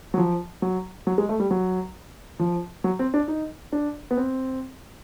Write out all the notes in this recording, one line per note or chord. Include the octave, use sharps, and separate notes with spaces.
F#3
F3
F#3
F#3
G#3
A3
G3
F#3
F3
F#3
C4
D4
D#4
D4
B3
C4